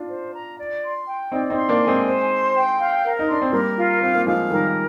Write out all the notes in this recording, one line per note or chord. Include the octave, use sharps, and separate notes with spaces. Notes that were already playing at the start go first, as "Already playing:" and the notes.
Already playing: D4 F4
C5
A#5
D5
C6
G5
C4 D#4 D5
C4 D#4
C6
A#3 D4
G#5
G#3 C4
C5
C6
G5
F5
A#4
D#4
D4 C6
C4
G3 A#3 A#4
F4
C4 F5
A#3
F3 G#3 F5
D#3 G3 A#4